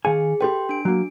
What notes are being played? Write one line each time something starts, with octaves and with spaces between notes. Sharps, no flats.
D#3 G#4 F5 G#5
G4 A4 B4 G5 C6
D4 D7
F#3 A#3